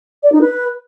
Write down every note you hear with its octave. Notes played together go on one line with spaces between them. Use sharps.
D5
D#4
B4